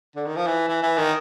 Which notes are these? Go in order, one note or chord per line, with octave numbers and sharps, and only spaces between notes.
D3
D#3
F3
E3
E3
E3
D#3